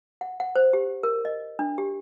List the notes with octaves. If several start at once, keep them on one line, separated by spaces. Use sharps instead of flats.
F#5
F#5
C5
G4
A#4
D#5
D4
G4